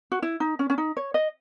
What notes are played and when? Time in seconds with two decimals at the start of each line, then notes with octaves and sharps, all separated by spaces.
0.12 F#4
0.22 E4
0.40 D#4
0.59 C#4
0.70 C#4
0.78 D#4
0.97 C#5
1.14 D#5